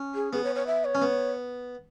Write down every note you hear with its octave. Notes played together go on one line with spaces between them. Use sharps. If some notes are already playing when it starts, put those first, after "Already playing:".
Already playing: C#4
G#4
B3 G#4
C#5
C#5
E5
C#5
C#4
B3